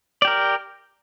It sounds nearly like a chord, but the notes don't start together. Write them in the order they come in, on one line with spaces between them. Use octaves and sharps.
D5 G4 A#4